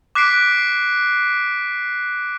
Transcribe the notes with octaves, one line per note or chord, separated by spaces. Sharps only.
D6 F#6 B6 C7 D7